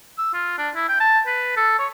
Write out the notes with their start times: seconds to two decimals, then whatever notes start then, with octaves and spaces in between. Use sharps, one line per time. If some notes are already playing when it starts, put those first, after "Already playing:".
0.18 E6
0.34 F4
0.58 D4
0.75 E4
0.89 G5
1.00 A5
1.27 B4
1.57 A4
1.79 C#5